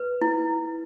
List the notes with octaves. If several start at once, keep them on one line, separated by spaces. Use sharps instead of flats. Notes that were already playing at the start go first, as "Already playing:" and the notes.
Already playing: B4
E4